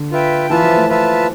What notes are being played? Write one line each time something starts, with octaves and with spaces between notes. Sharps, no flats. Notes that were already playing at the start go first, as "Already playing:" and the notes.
Already playing: D3
F4 B4 E5 G5
E3 F4 B4 E5 A5
F3
A3
F4 B4 E5 A5